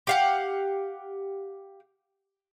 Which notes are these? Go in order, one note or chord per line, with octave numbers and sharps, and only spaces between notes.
G4 F5 F#5